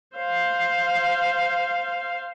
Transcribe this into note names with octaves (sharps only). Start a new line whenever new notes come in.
C5 F5